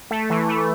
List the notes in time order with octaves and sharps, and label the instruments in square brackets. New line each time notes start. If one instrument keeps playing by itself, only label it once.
[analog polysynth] A3
E3
A3